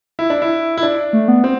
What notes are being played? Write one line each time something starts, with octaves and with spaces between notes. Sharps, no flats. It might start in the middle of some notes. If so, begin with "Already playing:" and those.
E4
D4
E4
E4
D4
A3
B3
C4